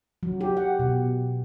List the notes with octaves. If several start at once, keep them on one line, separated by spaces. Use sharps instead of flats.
F#3
G4
F#5
B2